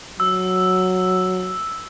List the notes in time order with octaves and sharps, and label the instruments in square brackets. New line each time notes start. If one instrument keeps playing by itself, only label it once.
[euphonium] F#3 [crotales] E6